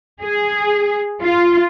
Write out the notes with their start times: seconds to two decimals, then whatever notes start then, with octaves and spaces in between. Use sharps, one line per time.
0.23 G#4
1.23 F4